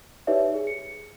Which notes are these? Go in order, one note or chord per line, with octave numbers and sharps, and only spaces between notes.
D#4 G4 B4 C#5 D5 E5
G#4
C#7